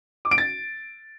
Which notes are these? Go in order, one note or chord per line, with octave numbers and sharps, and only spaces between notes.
D6
D7
A6